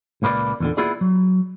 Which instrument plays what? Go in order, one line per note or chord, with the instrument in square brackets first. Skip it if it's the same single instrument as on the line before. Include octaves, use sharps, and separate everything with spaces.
[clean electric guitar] C#2 A#2 A#3 B4 D5
E2 A#2 D3
A#3 B3 E4 F4 G#4 D5
F#3